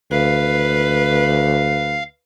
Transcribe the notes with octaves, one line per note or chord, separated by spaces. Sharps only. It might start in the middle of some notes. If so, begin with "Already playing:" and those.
D2 B4 F5